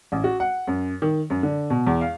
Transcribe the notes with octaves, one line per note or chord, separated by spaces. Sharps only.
A1
F#4
F#5
F#2
D#3
F#2
D3
B2
E2
F5